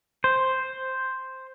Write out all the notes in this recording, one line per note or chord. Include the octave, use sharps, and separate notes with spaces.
C5